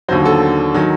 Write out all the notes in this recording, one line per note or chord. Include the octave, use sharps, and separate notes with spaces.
D#2 D3 F#3 C5
A4
D#3 F#3